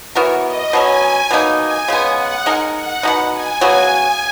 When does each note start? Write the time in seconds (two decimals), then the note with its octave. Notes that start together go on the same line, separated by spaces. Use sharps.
0.15 E3 B3 F#4 A#4 C#5
0.44 D#5
0.73 B2 F#3 C#4 G#5
1.31 B2 A#3 D#4
1.60 G#5
1.88 C#3 G#3 B3 G#5
2.18 F#5
2.46 G#3 D#4 A#4 G#5
2.75 F#5
3.03 B2 G#3 D#4 F#5
3.32 G#5
3.61 C#3 F#3 B3 F#4